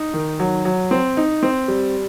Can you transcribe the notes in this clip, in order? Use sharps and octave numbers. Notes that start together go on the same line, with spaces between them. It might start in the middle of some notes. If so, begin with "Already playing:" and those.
Already playing: D#4
D#3
F#3
F#3
C4
D#4
C4
G3